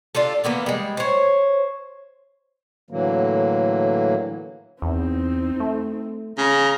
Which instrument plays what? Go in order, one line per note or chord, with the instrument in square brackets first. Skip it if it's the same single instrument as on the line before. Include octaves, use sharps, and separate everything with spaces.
[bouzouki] D4 F4 G4 A4
E3 A#3 B3 D4
G3 G#3
C5 C#5
[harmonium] A2 D3 E3 F#3 A#3
[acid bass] E2 [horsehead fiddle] C4 D#4
[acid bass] A3
[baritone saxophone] C#3 [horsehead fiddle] A#5